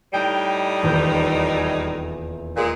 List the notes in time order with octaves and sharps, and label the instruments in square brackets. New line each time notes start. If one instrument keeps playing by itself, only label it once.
[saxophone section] A2 G3 D#4 [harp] G5
[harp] D#1 E2 G6
G#4
[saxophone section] A#2 G#3